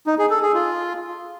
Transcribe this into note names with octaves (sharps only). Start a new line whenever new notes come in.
D#4
G#4
A4
G#4
F4